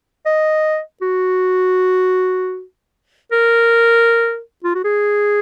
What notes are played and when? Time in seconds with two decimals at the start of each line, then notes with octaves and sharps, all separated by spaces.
0.26 D#5
1.02 F#4
3.32 A#4
4.64 F4
4.75 F#4
4.84 G#4